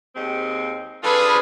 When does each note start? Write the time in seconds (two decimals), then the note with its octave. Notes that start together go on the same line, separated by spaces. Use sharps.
0.15 D#2 G#3 C4
1.03 D4 F4 G#4 A4 B4